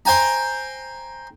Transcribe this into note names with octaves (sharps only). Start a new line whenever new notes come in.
C5 G5 G#5 A#5